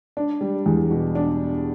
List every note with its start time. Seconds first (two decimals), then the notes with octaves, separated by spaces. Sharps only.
0.17 D4
0.41 G3
0.66 E2
0.91 B2
1.15 D4